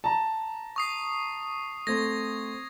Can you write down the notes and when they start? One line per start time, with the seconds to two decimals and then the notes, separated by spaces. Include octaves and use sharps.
0.04 A5 A#5
0.76 C#6 D#6 C7
1.87 A3 C4 G#6 A#6